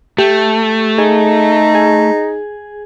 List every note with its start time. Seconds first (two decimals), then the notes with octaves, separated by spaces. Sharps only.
0.18 A3 G4
0.98 D#4 G#4
1.75 G#4